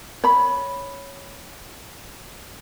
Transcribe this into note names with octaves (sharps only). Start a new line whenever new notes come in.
C#5 B5